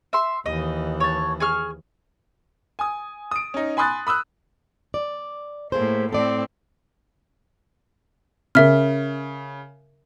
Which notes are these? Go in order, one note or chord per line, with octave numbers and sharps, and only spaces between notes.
E5 C6
D#2 E3 D#5
C#5 A5
G#4 C#6 F6
G#5 D#6
D#6 D7
C#4 D#4
G#5 B5 C6 D#6 F#6 A6
B5 D#6 E6 F#6
D5
A2 A3 A#3 G#4 C5
A2 C4 A4 D5
C#3 A#4 E5 F6